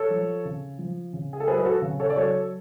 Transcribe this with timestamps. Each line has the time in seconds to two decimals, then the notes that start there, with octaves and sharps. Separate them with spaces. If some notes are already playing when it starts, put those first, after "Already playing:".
Already playing: A4 C#5
0.10 F3
0.45 C#3
0.78 F3
1.13 C#3
1.33 G#4
1.40 A4
1.47 F#3 G#4 B4
1.59 B4
1.65 F#4 A4
1.82 C#3
2.00 A4 C#5
2.10 D5
2.16 F#3 A4 C#5